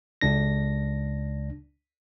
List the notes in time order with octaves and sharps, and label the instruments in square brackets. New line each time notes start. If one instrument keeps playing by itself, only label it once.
[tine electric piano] C#2 D4 A#6